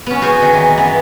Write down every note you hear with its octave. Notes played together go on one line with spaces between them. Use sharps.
B3 C#4
F#4 G#4 C5 G#5
D#3
E3
F#2 B3